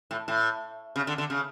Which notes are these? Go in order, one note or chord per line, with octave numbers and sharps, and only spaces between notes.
A2
A2
C#3
D3
D3
C#3